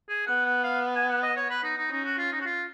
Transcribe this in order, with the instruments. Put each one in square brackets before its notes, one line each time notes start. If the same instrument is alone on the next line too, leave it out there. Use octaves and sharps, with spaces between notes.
[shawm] G#4
[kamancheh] B3 [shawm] F#5
[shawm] F#5
F5
G#5
F#5
D#5
C#5
B4
D#4
D#4
[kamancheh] C#4 [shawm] D#4
[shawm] F#4
F4
D#4
F#4
F4